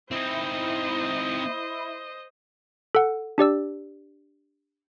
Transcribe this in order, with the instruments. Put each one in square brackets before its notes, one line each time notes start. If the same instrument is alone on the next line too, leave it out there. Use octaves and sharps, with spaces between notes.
[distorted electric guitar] C4 D#4 [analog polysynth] E4 [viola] C5 D#5
[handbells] A4 F#5
D4 G4 D5 E6